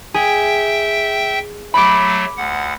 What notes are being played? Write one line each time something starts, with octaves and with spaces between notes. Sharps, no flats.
G#4 E5 G5
F#3 A3 B5 D6
D2 F#5